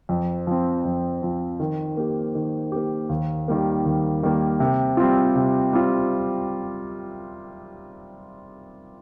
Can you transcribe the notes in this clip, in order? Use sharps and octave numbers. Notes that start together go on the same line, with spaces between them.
F2
F3 C4
F2
F3 C4
D#3
A#3 G4
D#3
A#3 G4
D#2
D#3 G3 A#3
D#2
D#3 G3 A#3
C3
G3 C4 F4
C3
G3 C4 F4